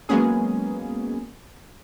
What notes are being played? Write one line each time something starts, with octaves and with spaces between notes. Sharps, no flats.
F#3 G#3 A#3 B3 C#4 G#4